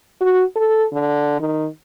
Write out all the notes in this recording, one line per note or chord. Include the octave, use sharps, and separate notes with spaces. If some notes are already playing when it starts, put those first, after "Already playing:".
F#4
A4
D3
D#3